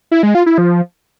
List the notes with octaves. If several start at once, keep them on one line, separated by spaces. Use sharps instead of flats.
E4
G#3
F4
E4
F3